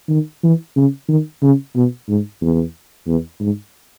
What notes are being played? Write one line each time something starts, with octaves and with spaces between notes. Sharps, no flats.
D#3
E3
C#3
D#3
C#3
B2
G#2
E2
E2
G#2